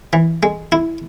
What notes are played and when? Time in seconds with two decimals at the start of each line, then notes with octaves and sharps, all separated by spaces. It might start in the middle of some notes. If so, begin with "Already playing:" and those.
0.13 E3
0.43 G#3
0.72 E4